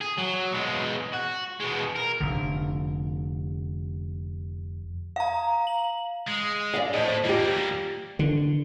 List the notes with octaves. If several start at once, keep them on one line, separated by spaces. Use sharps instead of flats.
G#4
F#3
B2 G#3
F#4
B2 G#3
A#4
F1 D3
F5 A#5
F#7
G#3
D5 E5 F5
F2 A2 C5 D#5
G3 A#3 F4 G4
D3